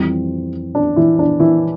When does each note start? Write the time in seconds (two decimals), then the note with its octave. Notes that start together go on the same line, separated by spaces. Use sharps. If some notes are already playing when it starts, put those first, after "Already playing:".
Already playing: F2 E3 G3 C4
0.75 D4
0.96 E3 E4
1.19 D4
1.40 E3 E4